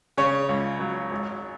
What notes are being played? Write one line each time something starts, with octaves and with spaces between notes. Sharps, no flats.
C#3 C#5
C#2
F#3
G#1